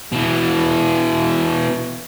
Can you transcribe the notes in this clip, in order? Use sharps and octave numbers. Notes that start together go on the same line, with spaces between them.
B2 E3